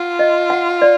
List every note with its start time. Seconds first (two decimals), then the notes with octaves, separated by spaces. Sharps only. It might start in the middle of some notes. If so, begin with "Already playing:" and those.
Already playing: F4 F#5
0.19 D#5
0.50 F#5
0.82 D5